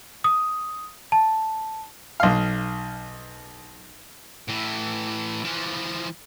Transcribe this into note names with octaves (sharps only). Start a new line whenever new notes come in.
D#6
A5
B1 F5
A2 E3
E3 F3